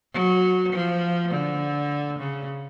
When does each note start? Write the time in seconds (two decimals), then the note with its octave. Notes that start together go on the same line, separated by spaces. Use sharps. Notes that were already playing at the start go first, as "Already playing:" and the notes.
0.13 F#3
0.73 F3
1.31 D3
2.19 C#3